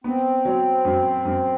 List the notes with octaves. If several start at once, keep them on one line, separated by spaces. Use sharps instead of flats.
B3 C4
F#3
F#2
F#2